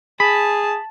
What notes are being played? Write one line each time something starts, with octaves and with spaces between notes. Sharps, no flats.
G#4 A5 B5